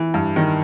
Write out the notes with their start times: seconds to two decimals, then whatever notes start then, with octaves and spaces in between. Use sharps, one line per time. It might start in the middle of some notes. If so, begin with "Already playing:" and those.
Already playing: E3
0.14 G2
0.36 D#3